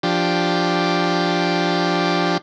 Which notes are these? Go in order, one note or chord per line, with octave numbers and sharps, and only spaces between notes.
F3 D4 G4